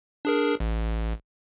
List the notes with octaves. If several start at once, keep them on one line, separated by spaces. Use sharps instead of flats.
D4 G#4 A#4
A1